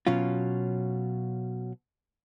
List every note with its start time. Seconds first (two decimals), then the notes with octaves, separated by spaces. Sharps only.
0.07 B2 F#3 C#4 F4